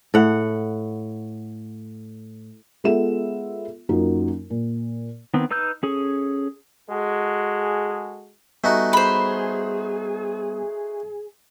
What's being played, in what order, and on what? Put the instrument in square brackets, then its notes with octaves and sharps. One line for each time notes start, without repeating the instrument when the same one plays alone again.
[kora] A2 F#5
[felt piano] G#3 B3 F4 A4 E5 E7
F#2 F#3 A#3 D#4 F4
A#2
[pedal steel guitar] D#3 B3 C4
D#4 B4 E6 F6 G6
C#4 G#4 A4
[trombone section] G#3 F#4 G#4 A4
[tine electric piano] G3 B3 G#5 [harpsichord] A3 D#4 F#4
[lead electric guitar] G#4 [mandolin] C5 B5